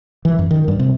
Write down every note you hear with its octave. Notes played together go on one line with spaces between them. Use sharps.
E3
F#2
D#3
G2
C3